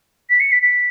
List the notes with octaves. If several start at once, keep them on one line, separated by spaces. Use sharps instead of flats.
B6
C#7
B6
B6